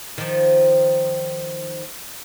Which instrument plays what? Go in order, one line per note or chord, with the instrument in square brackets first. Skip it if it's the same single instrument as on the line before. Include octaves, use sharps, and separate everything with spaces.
[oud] D#3 F3